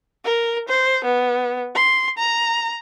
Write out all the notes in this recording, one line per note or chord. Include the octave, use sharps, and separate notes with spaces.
A#4
C5
B3
C6
A#5